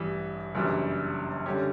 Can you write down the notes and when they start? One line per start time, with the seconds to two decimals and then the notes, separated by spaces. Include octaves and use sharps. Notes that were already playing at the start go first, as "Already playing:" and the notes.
Already playing: A1 G2 E3 G3
0.55 F#1 F#2 E3 G3 D4
1.46 D3 G3 C#4 G4